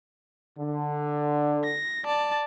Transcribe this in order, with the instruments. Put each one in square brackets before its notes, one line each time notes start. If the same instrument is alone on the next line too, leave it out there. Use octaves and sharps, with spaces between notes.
[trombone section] D3
[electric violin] A#6
D5 A5